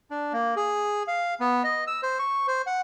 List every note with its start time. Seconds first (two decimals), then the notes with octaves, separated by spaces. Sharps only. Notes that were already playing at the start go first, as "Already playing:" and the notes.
0.11 D4
0.33 A#3
0.56 G#4
1.07 F5
1.40 B3
1.64 D#5
1.87 E6
2.03 C5
2.19 C#6
2.48 C5
2.67 F#5